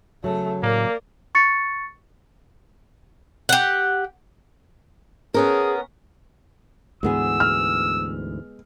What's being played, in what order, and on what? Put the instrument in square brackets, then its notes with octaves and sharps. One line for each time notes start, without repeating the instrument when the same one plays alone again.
[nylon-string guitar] C#3 F#3 [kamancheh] A3
[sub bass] A2 [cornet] A#3 [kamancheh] A#4 D5
[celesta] C#6 A6 C#7
[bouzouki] G4 F#5
[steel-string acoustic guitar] B3 C#4 A#4 [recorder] G#4
[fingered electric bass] D2 G#2 E3 [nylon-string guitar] G#3 B3 G#4 [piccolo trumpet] E6
[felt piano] F6